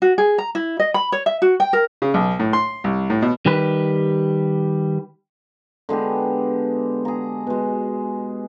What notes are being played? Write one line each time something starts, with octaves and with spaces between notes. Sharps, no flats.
F#4
G#4
A#5
E4
D#5
B5
C#5
E5
F#4
G5
A#4
C#3
B1
A2
C6
C2
A2
B2
D#3 G3 G4 B4
D3 G#3 B3 G4
G#4 A#5
B2 G#3